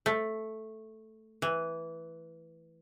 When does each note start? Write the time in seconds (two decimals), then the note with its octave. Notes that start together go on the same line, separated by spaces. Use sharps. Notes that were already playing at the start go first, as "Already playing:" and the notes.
0.06 A3
1.42 E3